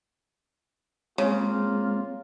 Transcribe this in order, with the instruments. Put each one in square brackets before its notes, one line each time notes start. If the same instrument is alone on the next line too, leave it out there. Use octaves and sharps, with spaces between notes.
[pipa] C#3 [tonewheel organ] G#3 C4 [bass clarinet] A#3 [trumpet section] F4